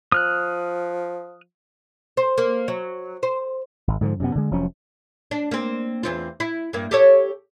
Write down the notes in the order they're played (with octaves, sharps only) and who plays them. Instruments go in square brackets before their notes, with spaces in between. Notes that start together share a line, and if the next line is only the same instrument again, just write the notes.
[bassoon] F3 [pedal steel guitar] D#6 F6 F#6
[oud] C5
A#3
F#3
C5
[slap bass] G#1
G#2 D3 E3 F3
F#2 C3 B3
D3 G#3
F1 F3 F#3 C#4
[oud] D4
A#3 C4
E2 C4 F4
E4
G2 A#3
G4 A4 C#5